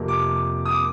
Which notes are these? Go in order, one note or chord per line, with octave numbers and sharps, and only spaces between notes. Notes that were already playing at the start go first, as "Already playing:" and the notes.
Already playing: F2 C3 F3 A#3
D6
D#6
D6